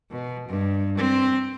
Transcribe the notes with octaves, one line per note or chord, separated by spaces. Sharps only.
B2
G2
C4